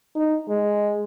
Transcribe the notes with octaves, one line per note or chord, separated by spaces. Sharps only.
D#4
G#3